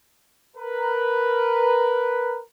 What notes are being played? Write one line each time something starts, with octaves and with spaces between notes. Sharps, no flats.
A#4 B4